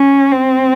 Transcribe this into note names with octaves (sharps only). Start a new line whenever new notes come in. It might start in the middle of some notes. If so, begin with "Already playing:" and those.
Already playing: C#4
C4